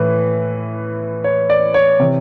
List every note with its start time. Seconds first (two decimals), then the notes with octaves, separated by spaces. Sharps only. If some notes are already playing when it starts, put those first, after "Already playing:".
Already playing: A2 E3 B4
1.24 C#5
1.50 D5
1.74 C#5
1.99 C3 E3